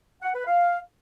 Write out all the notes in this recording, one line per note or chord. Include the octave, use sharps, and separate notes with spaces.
F#5
B4
F5